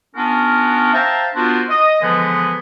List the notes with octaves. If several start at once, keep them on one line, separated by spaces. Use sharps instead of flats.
B3 C#4 D4 F4 F#4 A#4
C5 E5 F5 G5 A5 A#5
B3 D4 F4 F#4 A#4 C5
D#5
D3 E3 F3 G#3 B3